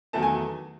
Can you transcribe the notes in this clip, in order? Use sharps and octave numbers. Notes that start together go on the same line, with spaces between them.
E2 D#3 F#3 A3 A5
G#5